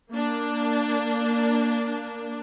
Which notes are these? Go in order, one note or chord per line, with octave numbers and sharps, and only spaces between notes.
A#3 D4